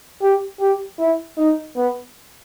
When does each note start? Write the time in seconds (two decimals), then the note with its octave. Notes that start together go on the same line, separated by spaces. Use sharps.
0.21 G4
0.60 G4
0.99 E4
1.37 D#4
1.76 B3